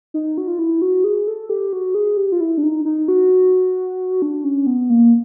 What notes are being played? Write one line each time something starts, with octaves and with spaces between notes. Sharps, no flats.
D#4
F#4
F4
E4
F#4
G#4
A4
G4
F#4
G#4
G4
F4
E4
D4
D#4
D#4
F#4
D4
C#4
B3
A#3